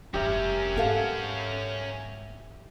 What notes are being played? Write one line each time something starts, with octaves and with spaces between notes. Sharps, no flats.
F1 G2 C#4 G4 A#4 E5
G#2 B3 A4 F5